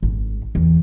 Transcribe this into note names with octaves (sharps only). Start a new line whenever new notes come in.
G#1
E2